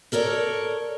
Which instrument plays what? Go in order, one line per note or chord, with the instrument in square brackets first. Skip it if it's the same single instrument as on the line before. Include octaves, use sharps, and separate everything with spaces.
[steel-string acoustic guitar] A4 A#4 C#5 D5